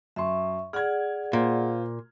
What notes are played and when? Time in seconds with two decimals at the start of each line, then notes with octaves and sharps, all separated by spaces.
0.16 F#2 E5 C6 C#6
0.73 G#4 D5 F#5 F6 G#6
1.33 A#2 F4 C5